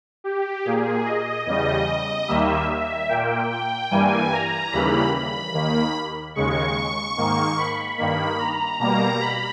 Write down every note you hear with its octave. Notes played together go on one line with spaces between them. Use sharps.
G4
A#2 A#3 G#4
D#5
E2 C#3 G3 D#5
D#2 D#3 G3 A#3 E5
E5
A#2 A#3 G5
G5
G2 E3 G3 A#3 G#5
A#5
D#2 C#3 E3 G3 A#3 B5
B5
D#2 D#3 A#3
D#2 C#3 G#3 C#6
G#2 D#3 A#3
B5
G2 D#3 A#3 B5
A#5
B2 G3 A#3 A#5
B5